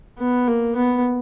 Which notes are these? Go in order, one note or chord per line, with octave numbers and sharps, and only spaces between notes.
B3
A#3
B3